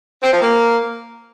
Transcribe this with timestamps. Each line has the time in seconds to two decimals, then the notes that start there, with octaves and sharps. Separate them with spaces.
0.23 C4
0.32 F3
0.41 A#3